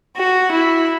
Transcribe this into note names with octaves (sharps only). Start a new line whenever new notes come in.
F#4
E4